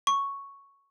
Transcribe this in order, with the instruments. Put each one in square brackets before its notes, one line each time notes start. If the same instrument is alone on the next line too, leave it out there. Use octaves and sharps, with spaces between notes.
[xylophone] C#6